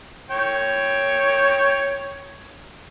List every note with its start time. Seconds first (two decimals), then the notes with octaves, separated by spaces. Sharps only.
0.30 C#5 G5